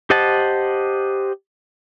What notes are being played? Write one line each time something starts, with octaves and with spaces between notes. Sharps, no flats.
G4 C5 D#5 F#5 A5